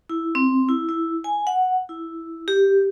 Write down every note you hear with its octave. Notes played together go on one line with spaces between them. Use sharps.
E4
C4
E4
E4
G#5
F#5
E4
G4